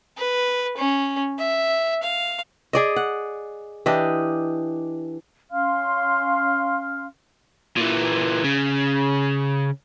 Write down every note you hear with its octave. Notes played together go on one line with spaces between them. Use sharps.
B4
C#4
E5
F5
G#4 D5 D#5
F#5
E3 D4 G4 D#5
C#4 F5 C6 F6
A#2 E3
C#3